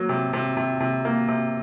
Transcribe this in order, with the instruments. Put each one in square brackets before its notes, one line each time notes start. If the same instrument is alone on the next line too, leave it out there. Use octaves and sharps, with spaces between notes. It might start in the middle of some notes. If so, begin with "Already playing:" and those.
Already playing: [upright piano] F#3 A#3
C3
C3
C3
C3
A#3
C3